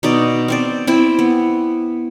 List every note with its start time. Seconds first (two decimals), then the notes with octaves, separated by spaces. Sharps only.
0.03 B2 D#4 D5
0.48 C4 C5 D5
0.87 C4 E4
1.19 B3